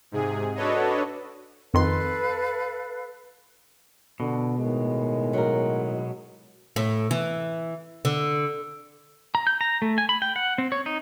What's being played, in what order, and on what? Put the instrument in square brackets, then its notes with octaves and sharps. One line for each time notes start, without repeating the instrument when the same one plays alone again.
[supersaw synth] G#2 C3 G#4
D4 F#4 A4 B4 C#5 D#5
[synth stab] F2 D#3 C6 [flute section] A4 B4 F5
[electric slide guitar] B2 [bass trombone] D3
[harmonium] A2 D#3 [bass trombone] G#3
[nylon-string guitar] F#3 A#4
[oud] A2
E3
D3
[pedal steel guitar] A#5
G6
A#5
A3
G#5
B5
G5
F#5
C4
C#5
D#4